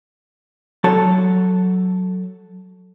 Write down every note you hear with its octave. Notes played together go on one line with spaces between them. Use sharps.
F#3 F#4 A4 C#5 A5